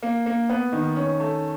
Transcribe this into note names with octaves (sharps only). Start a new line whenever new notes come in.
A#3
A#3
B3
D#3
C#4
A3